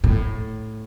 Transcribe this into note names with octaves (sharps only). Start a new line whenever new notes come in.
A2